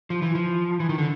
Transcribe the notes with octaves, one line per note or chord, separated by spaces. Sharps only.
F3
E3
F3
E3
D#3
D3